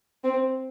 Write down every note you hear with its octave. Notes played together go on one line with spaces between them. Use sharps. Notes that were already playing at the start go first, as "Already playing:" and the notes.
C4